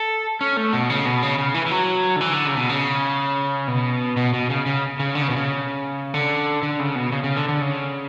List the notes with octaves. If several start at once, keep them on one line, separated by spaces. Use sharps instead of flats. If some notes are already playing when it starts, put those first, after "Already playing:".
Already playing: A4
C#4
A3
B2
C#3
B2
C#3
C#3
E3
E3
F#3
D3
E3
D3
C#3
B2
C#3
B2
B2
B2
C#3
C#3
C#3
D3
C#3
B2
C#3
D3
D3
C#3
B2
C#3
C#3
D3
D3
C#3